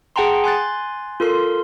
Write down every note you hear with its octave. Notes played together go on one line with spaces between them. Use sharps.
G#4 F#5 G5 A5 A#5 C6
G#5 C6 F#6 A6
F4 A4 A#4 C6